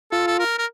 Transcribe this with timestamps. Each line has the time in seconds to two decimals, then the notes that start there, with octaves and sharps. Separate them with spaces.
0.12 F4 A4
0.27 A4
0.39 A#4
0.58 A#4